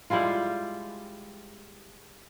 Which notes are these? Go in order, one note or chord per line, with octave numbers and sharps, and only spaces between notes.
G3 G#3 E4 F4